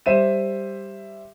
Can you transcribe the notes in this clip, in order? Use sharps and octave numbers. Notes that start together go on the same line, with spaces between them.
G3 C5 E5 D#7 E7